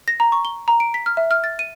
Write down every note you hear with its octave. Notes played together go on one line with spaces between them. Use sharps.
A#6
A#5
C#6
G7
A#5
D7
B6
F6
E5
F6
A6
D#7